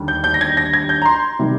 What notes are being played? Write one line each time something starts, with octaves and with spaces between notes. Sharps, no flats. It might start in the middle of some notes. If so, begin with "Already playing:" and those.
Already playing: D#2 D3 G3
G6
G6
A#6
G#6
A#6
G#6
G6
A#5
C6
C3 D#3 G3